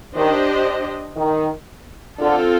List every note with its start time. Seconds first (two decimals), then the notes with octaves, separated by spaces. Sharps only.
0.15 D#3 D4 G4 C5 D#5
1.17 D#3
2.18 D3 C4 F4 A4